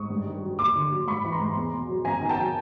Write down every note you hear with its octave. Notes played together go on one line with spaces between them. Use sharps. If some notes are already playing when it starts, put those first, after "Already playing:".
Already playing: G#2 C#6 D#6
G2
D#3
F#3
D#2 C6 D6
D3
F#3
G#2 B5 C#6
E3
A#5 C6
G#2
E2
B2
F#3
F#2 G#5 A#5
D#3
G5 A5
F#3